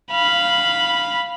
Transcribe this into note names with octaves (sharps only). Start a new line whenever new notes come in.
F5 B5